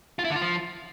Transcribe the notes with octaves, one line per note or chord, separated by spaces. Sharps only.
F4
E4
D3
F4
F3